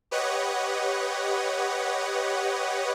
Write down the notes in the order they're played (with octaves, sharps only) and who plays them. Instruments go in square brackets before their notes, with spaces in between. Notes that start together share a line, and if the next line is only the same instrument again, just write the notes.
[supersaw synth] G4 B4 C#5 D#5 F#5